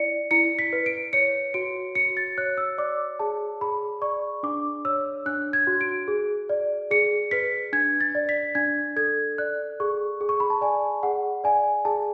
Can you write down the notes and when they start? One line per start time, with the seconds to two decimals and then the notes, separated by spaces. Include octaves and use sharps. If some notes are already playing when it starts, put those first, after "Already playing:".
Already playing: E4 D5 C#7
0.31 E4 C#7
0.59 B6
0.73 B4
0.86 D7
1.13 C#5 C#7
1.54 F#4 D7
1.95 F#4 C#7
2.17 A6
2.38 C#5 F#6
2.58 E6
2.78 D5 D6
3.19 G#4 A5
3.61 G#4 B5
4.02 D5 C#6
4.43 D4 D6
4.85 C#5 E6
5.26 D4 F#6
5.53 G#6
5.67 F#4
5.81 D7
6.08 G#4
6.49 D5
6.91 G#4 C#7
7.31 B4 B6
7.73 D4 G#6
8.01 A6
8.15 D5
8.29 B6
8.55 D4 G#6
8.96 A4 G#6
9.38 D5 F#6
9.80 G#4 C#6
10.21 G#4
10.29 C#6
10.40 B5
10.50 A5
10.61 D5 G#5
11.03 G#4 F#5
11.44 D5 G#5
11.85 G#4 A5